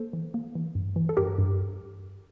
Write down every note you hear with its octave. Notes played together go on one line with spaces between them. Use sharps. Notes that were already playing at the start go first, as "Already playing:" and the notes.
Already playing: A#3 A4 C5
E3
A#3
E3
G2
E3
A4
G2 G4 A#4
G2